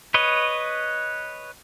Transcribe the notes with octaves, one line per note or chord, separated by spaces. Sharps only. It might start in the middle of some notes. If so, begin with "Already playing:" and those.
B4 C#5 D#5